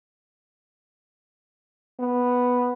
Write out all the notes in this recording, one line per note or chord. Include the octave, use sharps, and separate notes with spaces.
B3